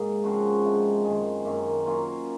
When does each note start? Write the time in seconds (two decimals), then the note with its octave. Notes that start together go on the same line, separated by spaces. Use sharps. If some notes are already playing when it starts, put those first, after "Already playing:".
Already playing: G#2 A#3
0.24 C#3 F3 C4 F#4
0.65 C3 F3 G#3
1.05 F#2 D#3 G#3
1.45 F#2 D#3 A#3
1.86 F#3 A#3 C#4 F4